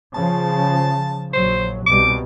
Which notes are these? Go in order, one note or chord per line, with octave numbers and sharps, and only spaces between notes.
C#3 F3 A5
A#1 F#3 C5
C2 B2 G3 D6